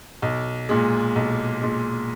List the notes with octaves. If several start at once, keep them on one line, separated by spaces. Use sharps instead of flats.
B1
A#2 G#3
B1
A#2 G#3